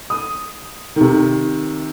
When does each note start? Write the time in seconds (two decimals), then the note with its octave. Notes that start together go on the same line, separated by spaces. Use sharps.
0.10 D#6
0.96 C3 D#3